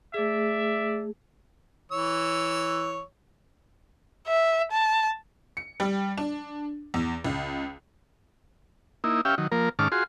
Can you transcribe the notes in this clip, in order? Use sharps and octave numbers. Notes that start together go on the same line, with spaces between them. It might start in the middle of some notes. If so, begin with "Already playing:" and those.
A3 G#4 D5 E5
E3 C#5 E6
E5
A5
C#7
G3
D4
E2
C#2
A#3 D#4 E4
C#4 G4 E5 F5 G5
D#3 F#3
F3 A#3 A#4
G#2 D#3 C#4 A5 D6 F6
F4 F#4 G#4 C6